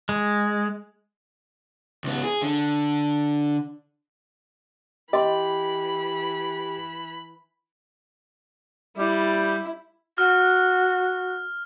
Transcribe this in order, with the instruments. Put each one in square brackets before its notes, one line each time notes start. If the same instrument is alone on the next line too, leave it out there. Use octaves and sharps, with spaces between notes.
[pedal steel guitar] G#3
[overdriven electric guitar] C#2 B3
G#4
D3
[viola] E3 B5 [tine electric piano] G4 [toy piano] D#5 C6
[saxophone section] G3 [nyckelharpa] E4
[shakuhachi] F#4 [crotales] F6